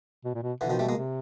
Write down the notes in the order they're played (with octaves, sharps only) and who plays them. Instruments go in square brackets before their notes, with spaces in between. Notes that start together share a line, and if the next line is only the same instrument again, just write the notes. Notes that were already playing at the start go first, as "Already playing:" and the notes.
[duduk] B2
A#2
B2
[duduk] B2 [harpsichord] D3 E3
[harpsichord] D#3 F3
G3 A3
G#3 A#3
[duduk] C3